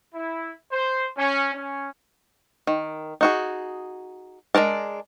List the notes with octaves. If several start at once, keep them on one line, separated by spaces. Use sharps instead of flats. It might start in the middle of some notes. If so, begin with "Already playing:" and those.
E4
C5
C#4
C#4
D#3
D#4 F#4 G#4
G#3 D4 A#4 A5